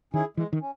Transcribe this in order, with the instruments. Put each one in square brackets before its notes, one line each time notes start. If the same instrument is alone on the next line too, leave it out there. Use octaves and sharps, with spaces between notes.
[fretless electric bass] D#3 [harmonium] C#4 E4 G#4
[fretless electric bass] E3 [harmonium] G#3
[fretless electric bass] D#3
[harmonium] C#4